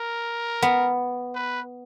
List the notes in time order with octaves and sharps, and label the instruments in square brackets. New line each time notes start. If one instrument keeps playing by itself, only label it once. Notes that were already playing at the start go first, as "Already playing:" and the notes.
Already playing: [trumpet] A#4
[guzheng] B3
[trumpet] B4